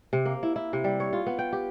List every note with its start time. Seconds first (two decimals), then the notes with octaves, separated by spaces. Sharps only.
0.13 C3
0.25 A#3
0.43 E4
0.56 E4
0.73 C3
0.84 G3
1.00 C#5
1.13 F4
1.26 B3
1.39 G5
1.53 G4